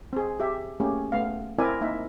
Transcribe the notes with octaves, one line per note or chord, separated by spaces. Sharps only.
C4 G#4
G4 G#4 E5
A3 A#3 C#4 G4 G#4
A3 B3 F5
C4 E4 A#4 D5 E5 G#5
A#3 D#4 E5